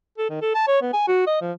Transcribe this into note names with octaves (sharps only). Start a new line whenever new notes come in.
A4
D#3
A4
A5
C#5
B3
G#5
F#4
D#5
F3